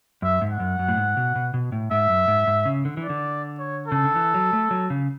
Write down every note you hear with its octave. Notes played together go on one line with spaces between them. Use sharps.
F#2 E5
G#2
F#5
F#2
F#2
A2
G#2
B2
B2
B2
A2
G#2 E5
F#2
G#2
G#2
C#3
D3
E3
D5
D3
C#5
C#3 A4
D3
E3
F#3
A3
F#3
C#3